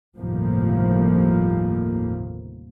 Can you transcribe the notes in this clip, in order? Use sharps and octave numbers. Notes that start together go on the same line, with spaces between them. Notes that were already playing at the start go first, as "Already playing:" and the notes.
G1 D#2 A2 C3 F3 A#3